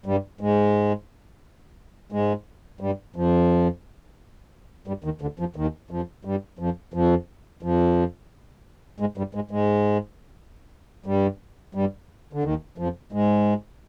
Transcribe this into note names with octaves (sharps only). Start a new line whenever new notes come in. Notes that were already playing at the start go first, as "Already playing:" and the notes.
G2 G3
G#2 G#3
G#2 G#3
G2 G3
F2 F3
G2 G3
D#2 D#3
D2 D3
F2 F3
D#2 D#3
F2 F3
G2 G3
F2 F3
F2 F3
F2 F3
G#2 G#3
G2 G3
G#2 G#3
G#2 G#3
G2 G3
G2 G3
D3
D#2 D#3
F2 F3
G#2 G#3